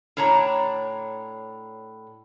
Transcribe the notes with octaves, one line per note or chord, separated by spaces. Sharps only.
A2 D4 C#5 A5 A#5